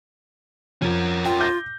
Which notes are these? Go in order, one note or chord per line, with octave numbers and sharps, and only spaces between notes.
F2 C#4 A#4
F4 G5
D6 G6 A#6